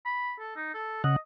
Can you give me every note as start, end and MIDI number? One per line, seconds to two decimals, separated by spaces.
0.05 0.35 83
0.40 0.53 69
0.56 0.71 63
0.74 1.01 69
1.04 1.16 49
1.04 1.18 75
1.04 1.16 78